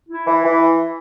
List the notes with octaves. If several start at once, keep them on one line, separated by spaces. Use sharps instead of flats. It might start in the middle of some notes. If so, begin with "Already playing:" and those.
E4
E3
E3